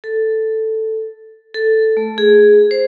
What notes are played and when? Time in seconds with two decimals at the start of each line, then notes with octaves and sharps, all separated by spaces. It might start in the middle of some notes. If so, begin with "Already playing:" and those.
0.04 A4
1.54 A4
1.97 A3
2.18 G#4
2.71 C5